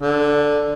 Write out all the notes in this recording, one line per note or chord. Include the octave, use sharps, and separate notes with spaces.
D3